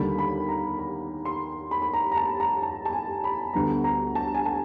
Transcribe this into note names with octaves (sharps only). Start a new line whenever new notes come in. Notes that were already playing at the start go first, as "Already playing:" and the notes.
Already playing: D#2 D3 G3 A#3 B5
B5
A#5
B5
C6
B5
B5
A#5
A#5
A5
A#5
A5
A5
G#5
B5
D2 D3 G3 B3 A#5
A#5
A5
G#5
A5